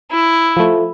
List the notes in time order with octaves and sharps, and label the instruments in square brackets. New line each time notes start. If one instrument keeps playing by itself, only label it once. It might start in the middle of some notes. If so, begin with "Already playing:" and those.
[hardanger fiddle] E4
[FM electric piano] F3 A3